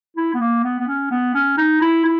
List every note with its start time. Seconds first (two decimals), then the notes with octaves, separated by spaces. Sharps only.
0.16 E4
0.34 B3
0.40 A#3
0.64 B3
0.79 B3
0.87 C#4
1.11 B3
1.34 C#4
1.57 D#4
1.81 E4
2.05 E4